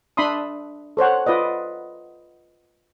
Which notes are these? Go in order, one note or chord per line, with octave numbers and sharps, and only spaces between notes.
D4 E5 B5 C6 D#6
A4 C5 C#5 F#5
F4 B4 D5 D#5